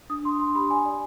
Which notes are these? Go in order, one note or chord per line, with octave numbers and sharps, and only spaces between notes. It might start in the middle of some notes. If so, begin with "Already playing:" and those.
D4 D#6
D4 C6
D4 C6
G4 B5
D5 G#5
D5